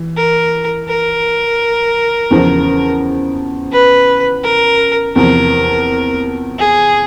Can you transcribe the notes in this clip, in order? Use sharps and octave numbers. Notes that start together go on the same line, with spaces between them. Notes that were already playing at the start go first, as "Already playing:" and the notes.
Already playing: E3
A#4
A#4
E2 C#3 F3
B4
A#4
E2 C3 F3 A#4
G#4